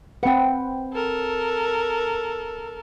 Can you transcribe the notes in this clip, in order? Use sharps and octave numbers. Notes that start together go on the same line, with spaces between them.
C4 B4 F#5 G5
A4 A#4